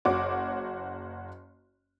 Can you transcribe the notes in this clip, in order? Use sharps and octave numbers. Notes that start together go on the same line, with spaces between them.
F#1 F#4 C#5 D6